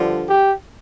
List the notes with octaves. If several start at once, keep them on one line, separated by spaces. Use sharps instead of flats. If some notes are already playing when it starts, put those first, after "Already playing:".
Already playing: G2 D3 F3
G4